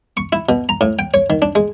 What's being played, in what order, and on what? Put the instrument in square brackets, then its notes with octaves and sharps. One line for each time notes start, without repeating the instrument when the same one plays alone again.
[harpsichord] C#6
E4
B2
A#5
A2
G5
C#5
D#3
D4
G#3